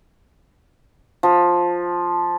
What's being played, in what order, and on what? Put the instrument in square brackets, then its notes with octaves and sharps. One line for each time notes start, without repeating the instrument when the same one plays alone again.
[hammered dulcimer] F3